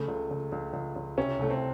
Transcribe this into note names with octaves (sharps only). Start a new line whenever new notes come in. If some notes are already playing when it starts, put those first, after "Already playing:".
Already playing: C#3 A3
C#2
C#2
C#2
C#2
C#2
C3 C#4
C2 A3
C4